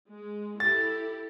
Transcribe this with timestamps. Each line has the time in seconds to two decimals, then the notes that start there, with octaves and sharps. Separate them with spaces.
0.10 G#3
0.60 E4 G4 A4 A6